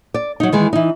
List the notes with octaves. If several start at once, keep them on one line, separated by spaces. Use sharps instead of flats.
D5
F#3 D#4
D#3 E3 G#3
E3 D#4